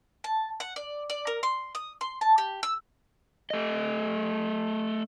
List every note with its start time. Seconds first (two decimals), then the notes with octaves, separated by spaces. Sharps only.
0.24 A5
0.60 F#5
0.76 D5
1.10 D5
1.27 A#4
1.43 C6
1.75 D#6
2.01 C6
2.21 A5
2.38 G4
2.63 E6
3.50 A3 D#5